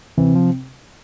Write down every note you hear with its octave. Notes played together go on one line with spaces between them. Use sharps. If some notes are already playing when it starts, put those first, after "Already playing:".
C3 E3
F3